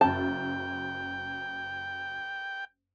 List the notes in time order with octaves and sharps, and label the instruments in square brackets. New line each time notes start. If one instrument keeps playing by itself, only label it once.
[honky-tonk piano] F#1 F#2 A6 [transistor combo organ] G5 [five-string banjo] A5